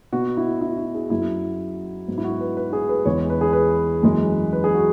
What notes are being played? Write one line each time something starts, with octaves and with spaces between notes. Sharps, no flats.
B2 B3 F#4
E4
E4
F#4
G#4
F#2 F#3 B3 E4
G#2 F#3 B3
E4
F#4
B4
B4
F#4
G#4
B4
E2 E3 G#3 B3 C#5
B4
G#4
B4
F#2 E3 G#3
B4
G#4
F#4